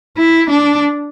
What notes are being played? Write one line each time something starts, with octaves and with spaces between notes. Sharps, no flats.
E4
D4